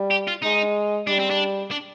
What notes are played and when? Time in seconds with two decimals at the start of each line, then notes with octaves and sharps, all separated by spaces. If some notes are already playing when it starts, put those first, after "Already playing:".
Already playing: G3
0.11 G4
0.28 F4
0.43 G#3 D#4
1.07 G3 D4
1.19 C4
1.30 D4
1.71 D4